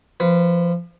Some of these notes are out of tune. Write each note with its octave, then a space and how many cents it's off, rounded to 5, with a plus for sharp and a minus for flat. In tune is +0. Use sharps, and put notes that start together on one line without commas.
F3 -20 B4 +0